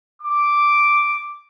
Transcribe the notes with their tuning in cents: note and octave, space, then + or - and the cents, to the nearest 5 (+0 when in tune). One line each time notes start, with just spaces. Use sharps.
D6 +0